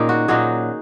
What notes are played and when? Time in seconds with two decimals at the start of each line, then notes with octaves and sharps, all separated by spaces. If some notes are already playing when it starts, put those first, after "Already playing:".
Already playing: A#2 D#3 C#4 D#4 G#4 A#4
0.09 F#4
0.28 A#2 F#3 D#4 G#4